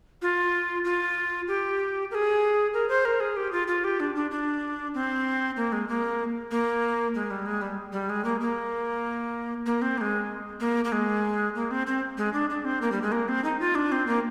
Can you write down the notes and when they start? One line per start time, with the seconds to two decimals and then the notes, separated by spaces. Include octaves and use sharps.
0.22 F4
0.85 F4
1.48 G4
2.11 A#4
2.15 G#4
2.73 A#4
2.89 C5
3.05 A#4
3.20 G#4
3.37 G4
3.52 F4
3.68 F4
3.84 G4
4.00 D4
4.15 D4
4.31 D4
4.94 C4
5.57 A#3
5.72 G#3
5.88 A#3
6.51 A#3
7.14 G#3
7.31 G3
7.46 G#3
7.62 G3
7.93 G3
8.09 G#3
8.25 A#3
8.40 A#3
9.66 A#3
9.82 C4
9.98 A#3
10.01 G#3
10.60 A#3
10.85 A#3
10.92 G#3
11.55 A#3
11.71 C4
11.87 C4
12.18 G#3
12.33 D4
12.50 D4
12.65 C4
12.82 A#3
12.92 G3
13.02 G#3
13.12 A#3
13.28 C4
13.44 D#4
13.60 F4
13.75 D4
13.92 C4
14.07 A#3